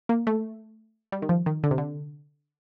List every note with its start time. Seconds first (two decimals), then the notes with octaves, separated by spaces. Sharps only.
0.09 A#3
0.27 A3
1.12 G3
1.22 D#3
1.29 F3
1.46 D#3
1.64 D3
1.71 C3
1.78 D3